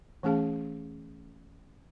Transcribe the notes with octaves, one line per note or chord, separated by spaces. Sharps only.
E3 A3 C#4 G#4 F5 A5